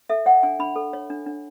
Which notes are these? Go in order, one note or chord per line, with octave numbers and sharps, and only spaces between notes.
A4 E5
C#5 F#5
D4 G#5
D4 B5
A4
C#5
D4
D4